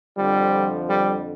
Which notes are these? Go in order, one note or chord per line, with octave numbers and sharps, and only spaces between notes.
F2 D3 F3 G3
G3